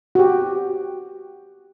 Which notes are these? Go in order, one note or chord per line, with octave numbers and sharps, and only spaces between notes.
F#4 G4